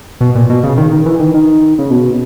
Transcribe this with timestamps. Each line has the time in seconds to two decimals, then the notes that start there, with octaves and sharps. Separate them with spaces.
0.21 B2
0.35 A#2
0.50 B2
0.64 C#3
0.77 D#3
0.91 D#3
1.06 E3
1.19 D#3
1.34 D#3
1.79 C#3
1.90 B2